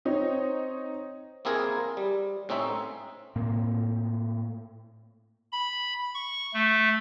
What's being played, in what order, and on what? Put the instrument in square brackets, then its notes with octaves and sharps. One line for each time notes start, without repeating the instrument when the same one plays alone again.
[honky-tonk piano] C4 D#4 C#5
[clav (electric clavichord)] A#3 C4 E4 G#4 A#4
G3
A2 C4 C#4 D#4 E5
[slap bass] A2 A#3 C4
[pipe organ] B5
C#6
A3